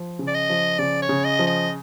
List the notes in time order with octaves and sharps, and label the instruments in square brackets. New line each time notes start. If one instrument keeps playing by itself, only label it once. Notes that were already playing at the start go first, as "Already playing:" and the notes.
Already playing: [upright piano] F3
C#3
[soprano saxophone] D5
D#5
[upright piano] F3
[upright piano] C#3 [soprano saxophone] D5
[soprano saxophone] C#5
[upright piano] C#3
[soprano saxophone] D#5
[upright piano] F3
[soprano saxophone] D#5